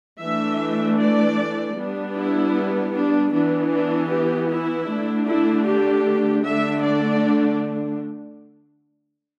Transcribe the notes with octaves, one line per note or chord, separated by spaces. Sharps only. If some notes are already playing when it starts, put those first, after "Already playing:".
E3 A3 D4 E5
D5
G3 B3 D4
E4
D4
E3 B3 D4
D4
G4
E4
D3 A3 D4
E4
G4
D3 A3 D4 E5
D5